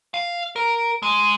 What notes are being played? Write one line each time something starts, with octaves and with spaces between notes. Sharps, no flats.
F5
A#4
G#3